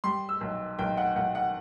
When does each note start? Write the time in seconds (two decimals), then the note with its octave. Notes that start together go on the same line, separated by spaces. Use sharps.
0.04 G3 C6
0.29 E6
0.41 B1
0.79 B1 G5
0.97 F#5
1.16 B1 F#5
1.35 F#5